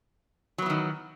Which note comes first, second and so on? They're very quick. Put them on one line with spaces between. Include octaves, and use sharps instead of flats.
F#3 B3 E3 D#3